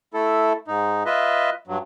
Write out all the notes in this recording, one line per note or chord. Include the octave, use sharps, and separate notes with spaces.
A3 E4 A4
G#2 D#4
F4 B4 D#5 E5
G2 F#3